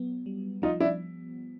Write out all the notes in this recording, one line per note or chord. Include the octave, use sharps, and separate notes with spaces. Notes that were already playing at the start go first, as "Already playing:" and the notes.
Already playing: F#3 B3
G3
F3 D#4 F4
D4 E4